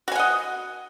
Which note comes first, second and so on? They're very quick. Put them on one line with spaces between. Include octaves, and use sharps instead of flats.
F#4 G#5 F#5 D#5